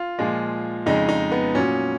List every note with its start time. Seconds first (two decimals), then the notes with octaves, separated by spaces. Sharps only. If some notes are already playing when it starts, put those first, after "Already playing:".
Already playing: F4
0.19 A#2 F3 G#3
0.86 F2 C#3 G#3 D#4
1.09 D#4
1.32 B3
1.55 A#2 F#3 C#4